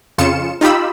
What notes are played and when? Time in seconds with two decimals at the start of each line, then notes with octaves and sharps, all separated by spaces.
0.18 F2 C#3 F4 C#7 E7
0.61 D#4 F4 G4 B5 E6